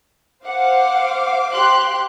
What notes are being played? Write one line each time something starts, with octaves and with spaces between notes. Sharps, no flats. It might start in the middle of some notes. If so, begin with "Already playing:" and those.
C5 F5 F#5 D6
G4 C6 F#6